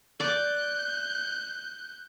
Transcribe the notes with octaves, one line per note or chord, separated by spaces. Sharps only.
D5 D6 F#6 G6